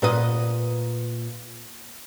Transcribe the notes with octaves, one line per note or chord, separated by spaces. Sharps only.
A#2 B4 D#5